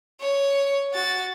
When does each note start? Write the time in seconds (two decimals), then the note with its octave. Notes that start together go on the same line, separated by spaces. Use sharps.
0.21 C#5
0.94 F#4 A6